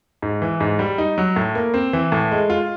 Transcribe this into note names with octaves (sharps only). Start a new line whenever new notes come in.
G#2
E3
G#2
G3
D#4
F#3
A2
A#3
C4
E3
A2
G#3
F4